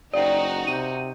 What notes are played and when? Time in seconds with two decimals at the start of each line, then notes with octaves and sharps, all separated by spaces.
0.14 F#1 D#4 F#4 C5 D5 F5 G5
0.67 C3 D#6 E6 G6 D#7